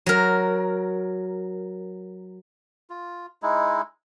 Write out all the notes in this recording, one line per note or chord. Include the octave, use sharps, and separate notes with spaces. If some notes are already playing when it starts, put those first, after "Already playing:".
F#3 A#4
F4
G#3 D#4 E4